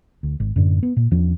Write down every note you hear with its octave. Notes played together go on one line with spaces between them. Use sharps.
D2
G#1
F#2 A2 D3
B3
A#2
E2 F3 C#4 D4